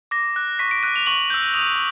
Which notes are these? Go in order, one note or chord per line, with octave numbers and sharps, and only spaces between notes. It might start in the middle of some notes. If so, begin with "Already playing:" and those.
D6 A#6
F#6
C#6 B6
D7
F#6 D#7
F7
C#6 F#7
E6 G6
D#6 F7